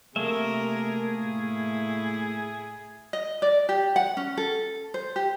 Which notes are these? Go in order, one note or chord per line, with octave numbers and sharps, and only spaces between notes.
C3 A3 A#3 G#4 A#4 E5
A2 E4
D#5
D5
G4
F#5
C#4
A4
C5
G4